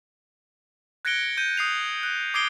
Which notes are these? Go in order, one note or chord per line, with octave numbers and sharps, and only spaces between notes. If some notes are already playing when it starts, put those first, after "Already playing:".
F#6 G#6 A#6 C#7 D7 G7
G6 D#7
D#6 C7 F7
F#6
D6 D#6 G#6 C7 D7 G7